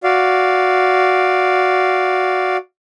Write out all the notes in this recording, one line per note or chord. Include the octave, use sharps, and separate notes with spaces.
F#4 D5 F5